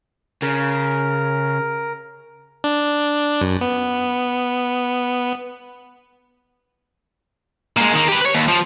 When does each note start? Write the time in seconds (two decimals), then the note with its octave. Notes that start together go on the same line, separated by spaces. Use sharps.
0.42 C#3 A#4
2.64 D4
3.41 F#2
3.61 B3
7.77 A#2 G#3
7.93 D#3 A#3
8.09 G4 B4
8.22 B4 C#5
8.35 D#2
8.49 F3